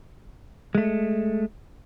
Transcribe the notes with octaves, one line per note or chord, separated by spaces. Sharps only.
G#3 A3